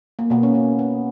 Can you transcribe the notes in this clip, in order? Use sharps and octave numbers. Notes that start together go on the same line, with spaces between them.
A#3
B2 A#3 B3
C#4
B3
B3